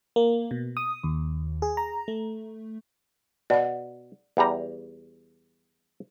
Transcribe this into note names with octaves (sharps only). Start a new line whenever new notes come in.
A#3
B2
D#6
D#2
G#4
A#5
A3
B2 D5 F#5
E2 G3 A#5